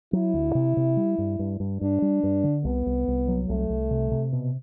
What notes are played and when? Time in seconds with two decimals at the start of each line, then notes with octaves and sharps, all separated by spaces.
0.13 F#3 E4
0.34 D2
0.55 C3
0.77 C3
0.97 G3
1.18 G2
1.39 G2
1.60 G2
1.81 G2 D4
2.02 G3
2.23 G2
2.44 D3
2.64 C2 B3
2.86 C2
3.08 C2
3.28 F#3
3.49 C2 A3
3.69 C2
3.90 C3
4.11 C3
4.33 B2